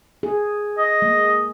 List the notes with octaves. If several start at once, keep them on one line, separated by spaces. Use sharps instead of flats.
G#4
D#5
G#3 A#3